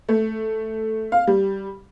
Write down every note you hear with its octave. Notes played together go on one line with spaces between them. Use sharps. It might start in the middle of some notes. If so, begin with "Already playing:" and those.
A3
F5
G3